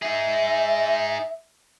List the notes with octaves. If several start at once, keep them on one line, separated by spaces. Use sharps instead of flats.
D#4 G#4 E5